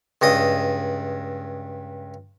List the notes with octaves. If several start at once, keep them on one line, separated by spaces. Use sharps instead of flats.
C#2 G2 D#5 D#6